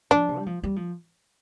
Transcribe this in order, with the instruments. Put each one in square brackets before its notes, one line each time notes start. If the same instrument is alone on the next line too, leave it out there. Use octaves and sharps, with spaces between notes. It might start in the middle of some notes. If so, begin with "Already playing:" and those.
[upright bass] F3 [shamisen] D4
[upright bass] C3
G3
F3
G3
F3